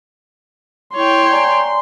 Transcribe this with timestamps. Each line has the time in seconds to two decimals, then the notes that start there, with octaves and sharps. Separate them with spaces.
0.96 E4 C#5 G5 C6
1.31 D5 G#5 A#5